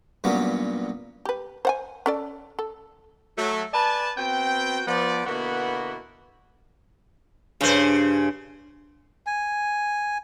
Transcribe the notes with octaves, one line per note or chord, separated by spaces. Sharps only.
G2 A#2 F#3 G3 B3 C#4
G4 B4
C5 F#5 G#5
C#4 A4 D5
A4
F#3 A3
B4 D5 G#5 A5
B3 C4 F#4 G5
F3 B3 D5
B2 D3 A#3 B3 E4 F#4
G2 C#3 C5
G#5